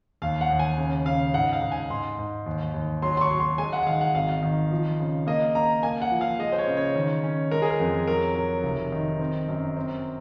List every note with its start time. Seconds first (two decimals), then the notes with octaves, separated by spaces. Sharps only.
0.22 D#2 F5
0.41 F#5
0.50 D#2
0.59 G#5
0.78 C#3
1.06 C#3 F5
1.34 G#2 F#5
1.53 F5
1.62 G#2
1.72 G#5
1.90 G#2 C6
2.19 G#2
2.46 D#2
2.74 D#2
3.02 F#3 C6
3.17 C6
3.21 C#6
3.31 F#3
3.40 C6
3.58 G#3 G#5
3.73 F#5
3.83 F#5
3.86 D#3 F5
4.01 F#5
4.15 G#1 F5
4.43 D#3
4.71 F3
5.00 C#3
5.27 A#3 D#5
5.55 A#3 A#5
5.83 A#3 G#5
6.02 F#5
6.11 F3
6.21 F5
6.39 G#3 D#5
6.52 C5
6.58 C#5
6.67 C#3
6.77 C#5
6.96 D#3
7.23 C#4
7.51 G#3 A#4
7.62 G#4
7.70 A#4
7.80 F2
8.07 F#3 A#4
8.35 F#3
8.64 F1
8.92 D#3
9.19 C4
9.48 F#2
9.76 C4